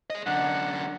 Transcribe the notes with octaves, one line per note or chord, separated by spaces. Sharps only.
G#4 D#5
F#2 D3 F#5